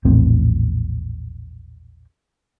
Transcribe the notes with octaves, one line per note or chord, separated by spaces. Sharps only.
A#1 E2 A2 C4